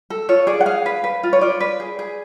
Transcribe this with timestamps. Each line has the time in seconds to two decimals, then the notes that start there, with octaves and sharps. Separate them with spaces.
0.10 A4
0.29 F4 C#5
0.47 G#4 D5
0.61 F#5
0.66 G#4 F5
0.86 B4
1.04 B4
1.23 F4
1.33 C#5
1.41 F4 D5
1.60 B4
1.80 G#4
1.99 G#4